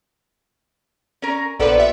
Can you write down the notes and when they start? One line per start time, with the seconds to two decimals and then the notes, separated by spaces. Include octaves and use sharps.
1.22 C#4 A#4
1.60 A#1 F3 B3 A4 B4 D5
1.78 F4 G4 E5